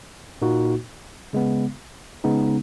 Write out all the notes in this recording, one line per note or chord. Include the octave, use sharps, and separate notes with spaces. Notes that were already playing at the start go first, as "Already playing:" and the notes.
A#2 A#3 D#4 F#4
C#3 G#3 B3
C#3 G#3 B3 D#4